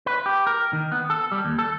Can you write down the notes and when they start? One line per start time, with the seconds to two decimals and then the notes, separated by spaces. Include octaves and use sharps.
0.06 B4
0.26 G4
0.47 A#4
0.73 D#3
0.92 B3
1.10 A4
1.32 G3
1.44 D#2
1.59 A4